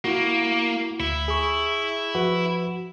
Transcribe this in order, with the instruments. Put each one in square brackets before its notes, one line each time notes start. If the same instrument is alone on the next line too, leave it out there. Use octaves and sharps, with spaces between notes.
[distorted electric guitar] A#3 [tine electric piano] E4 F#4
[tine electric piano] D2 [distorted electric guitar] E4
[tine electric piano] G#4 C#6
F3 F#4 B4